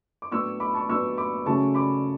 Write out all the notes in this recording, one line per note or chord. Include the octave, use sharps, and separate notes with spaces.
D6
A2 F#3 B3 D4 C#6 E6
B5 D6
A5 C#6
A2 F#3 B3 D4 C#6 E6
B5 D6
C#3 F#3 A3 C#4 A5 C#6
B5 D6